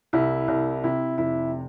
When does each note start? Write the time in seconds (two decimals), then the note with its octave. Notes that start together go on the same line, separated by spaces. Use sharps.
0.13 C2 E4
0.48 C2
0.84 C3 E4
1.18 F1 E4